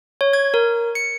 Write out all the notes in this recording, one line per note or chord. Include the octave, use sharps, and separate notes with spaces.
C#5
G#6
A#4
C#7